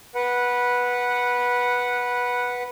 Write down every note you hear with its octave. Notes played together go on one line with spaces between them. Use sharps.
B4 F#5